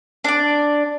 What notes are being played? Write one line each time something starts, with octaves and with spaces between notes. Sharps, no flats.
D4 D5